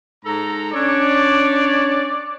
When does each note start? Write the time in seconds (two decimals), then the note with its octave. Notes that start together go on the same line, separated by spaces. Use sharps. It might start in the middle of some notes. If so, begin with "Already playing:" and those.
0.23 G#2 A4 A#5
0.72 C#4 D4 C#5 D5